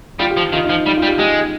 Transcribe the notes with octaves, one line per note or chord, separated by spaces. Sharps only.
G3 F4
G4
F3
D#3 F4
D#4
F3
G3 D#4
F4
G3
G4
G#3 G4